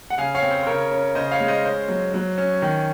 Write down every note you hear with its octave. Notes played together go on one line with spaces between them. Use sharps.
F#5
C#3 F5 G#5
C#5 F5
C4
C5
C5
C#3 A#4 C#5
C#4
C#3 C5 D#5
C#5 F5
G#3
C5 D#5
C#4 C5
F#3
F#3
C#4
D#3